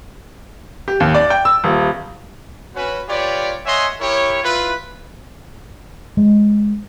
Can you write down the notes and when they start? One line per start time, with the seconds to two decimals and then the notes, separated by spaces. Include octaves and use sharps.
0.88 G4
1.00 D#2
1.15 D5
1.30 G5
1.45 E6
1.64 D#1
2.75 C#4 F#4 B4
3.08 F4 G4 B4 C#5 D5
3.66 C#5 D#5 E5 F#5 G#5 C6
4.00 E4 G4 A#4 C#5
4.43 E4 F4 B4
6.17 G#3